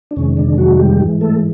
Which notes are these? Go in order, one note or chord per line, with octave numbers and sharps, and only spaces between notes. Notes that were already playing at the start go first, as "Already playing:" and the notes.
D4
F2 C3 D#3 G#3 C#4
D3 D4
F#3 F#4
G3 G4
G#2 E3 G#3
A3 A4